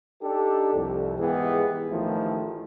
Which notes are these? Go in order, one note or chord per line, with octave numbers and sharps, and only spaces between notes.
D4 D#4 G4 A4
C2 F2
G#2 E3 G#3 B3 G4 G#4
A1 A2 D#3 F3 E4